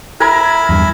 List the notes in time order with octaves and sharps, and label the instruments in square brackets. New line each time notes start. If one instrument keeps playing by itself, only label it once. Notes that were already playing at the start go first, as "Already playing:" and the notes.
[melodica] E4 B5 [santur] A#4 G#5
[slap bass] E2 G2